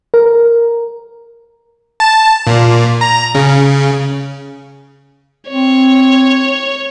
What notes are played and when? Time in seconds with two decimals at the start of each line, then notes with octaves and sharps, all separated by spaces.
0.14 A#4
2.00 A5
2.47 A#2
3.01 A#5
3.35 C#3
5.50 C4 C#5